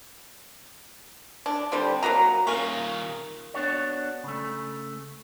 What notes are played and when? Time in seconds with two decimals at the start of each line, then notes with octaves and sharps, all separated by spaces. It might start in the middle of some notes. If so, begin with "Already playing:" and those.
1.46 D4
1.72 D3 G3 C4
2.03 F#3 A#3 F#4 A#5
2.47 A#2 D#3 C#4 A#4 F5 C#6
3.54 B3 D4 F#4 C#5
4.24 C#3 A3